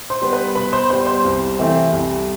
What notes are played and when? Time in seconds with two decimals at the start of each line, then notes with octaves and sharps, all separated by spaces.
0.10 C5 C6
0.22 G3 B3
0.33 B4 B5
0.55 B2 B4 B5
0.72 C5 C6
0.90 G3 B3 C5 C6
1.07 C5 C6
1.24 C2
1.58 C3 E3 A3 C4
1.92 C2